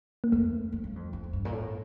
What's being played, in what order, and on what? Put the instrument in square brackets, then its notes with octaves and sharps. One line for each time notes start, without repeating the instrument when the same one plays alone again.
[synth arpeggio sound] A#3
[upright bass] F2 [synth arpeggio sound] A3
[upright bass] F2
G2
F2
F2
F2
G2
A#2
A2